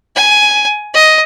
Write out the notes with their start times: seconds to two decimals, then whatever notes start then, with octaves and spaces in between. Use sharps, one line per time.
0.15 G#5
0.94 D#5